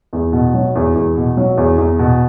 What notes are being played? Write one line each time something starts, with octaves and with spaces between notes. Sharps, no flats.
E2
B2
F#3
E2
E2
B2
F#3
E2
E2
B2